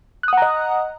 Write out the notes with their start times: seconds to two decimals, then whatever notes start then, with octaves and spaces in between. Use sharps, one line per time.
0.23 F#6
0.28 D#6
0.33 F#5
0.37 A#5
0.42 D#5